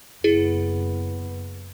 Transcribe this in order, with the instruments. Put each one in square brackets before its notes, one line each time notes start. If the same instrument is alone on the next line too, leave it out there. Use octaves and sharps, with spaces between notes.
[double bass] F#1 B3 [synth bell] E4 G#4